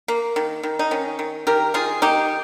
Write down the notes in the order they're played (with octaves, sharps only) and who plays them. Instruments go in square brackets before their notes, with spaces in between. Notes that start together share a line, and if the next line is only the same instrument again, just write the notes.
[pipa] A#3
D#3
D#3
D#4
D#3 C#4
D#3
D#3 G4 A#4
D#3 F4 G#4
A#3 D#4 G4